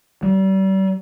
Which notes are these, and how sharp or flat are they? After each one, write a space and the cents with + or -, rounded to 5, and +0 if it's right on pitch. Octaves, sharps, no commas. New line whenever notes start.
G3 -35